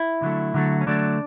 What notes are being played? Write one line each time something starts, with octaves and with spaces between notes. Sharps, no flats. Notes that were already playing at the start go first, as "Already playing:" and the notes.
Already playing: E4
D3 F#3 A3
D3 F#3 A3
C#4
D3 F#3 A3 D4